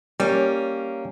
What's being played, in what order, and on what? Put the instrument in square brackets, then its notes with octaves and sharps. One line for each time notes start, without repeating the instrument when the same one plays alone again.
[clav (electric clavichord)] G3 [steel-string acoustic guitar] A#3 C#4